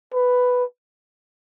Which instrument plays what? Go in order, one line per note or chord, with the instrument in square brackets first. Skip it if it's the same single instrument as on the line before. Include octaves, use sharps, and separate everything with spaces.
[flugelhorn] B4